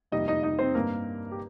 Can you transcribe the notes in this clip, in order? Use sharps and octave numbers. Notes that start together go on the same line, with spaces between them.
F2 C3 G3 A#3 D#4 D#5
D#4 D#5
D#4 D#5
C4 C5
G2 G3 A#3 A#4
G4